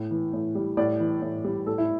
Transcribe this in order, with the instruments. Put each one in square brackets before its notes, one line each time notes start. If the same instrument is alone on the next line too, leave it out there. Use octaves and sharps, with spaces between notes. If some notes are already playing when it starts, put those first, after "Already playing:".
Already playing: [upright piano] A2
E3
A2
G3
A2 D5
E3
A2
G3
A2 A4
E4